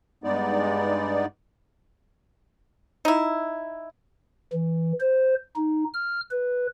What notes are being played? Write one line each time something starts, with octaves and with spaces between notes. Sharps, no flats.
G2 G#3 B3 D#4 D5
D#4 E4
E3
C5
D#4
F6
B4